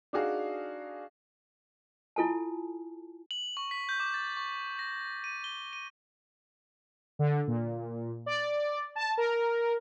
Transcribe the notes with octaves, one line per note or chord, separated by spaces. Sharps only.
D4 D#4 F#4 G#4 F5
E4 F4 A4 G#5 A5
F#7
C#6
B6
G6
D6
A6
C#6
A#6
D#7
G7
D#7
D3
A#2
D5
A5
A#4